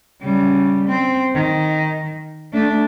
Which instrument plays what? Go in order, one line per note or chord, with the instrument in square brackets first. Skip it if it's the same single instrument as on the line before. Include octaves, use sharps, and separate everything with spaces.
[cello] C#3 G3
C4
D#3
A3 D4